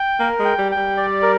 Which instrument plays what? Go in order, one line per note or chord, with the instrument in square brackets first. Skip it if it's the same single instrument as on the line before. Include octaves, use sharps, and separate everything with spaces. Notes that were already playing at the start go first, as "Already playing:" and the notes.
Already playing: [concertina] G5
[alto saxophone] A#3 [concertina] A#4
[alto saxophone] G#3
[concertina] G5
[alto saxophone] G3
[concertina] G5
[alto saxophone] G3
[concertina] D5
A#4